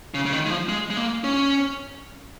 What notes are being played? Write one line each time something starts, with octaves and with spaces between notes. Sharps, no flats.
C#3
C#3
D#3
G#3
F3
G#3
G#3
A#3
C#4